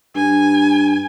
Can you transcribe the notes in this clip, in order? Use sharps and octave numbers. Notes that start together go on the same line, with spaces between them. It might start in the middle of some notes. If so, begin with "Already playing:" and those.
G2 G#5